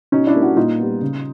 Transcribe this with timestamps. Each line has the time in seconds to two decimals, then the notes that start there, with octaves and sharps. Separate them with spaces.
0.12 B2 C#4 D#4
0.27 D4 E4
0.34 G3 A#3
0.42 E4 F#4
0.57 A#2 D#4 F4
0.79 G3 B3
1.02 C#3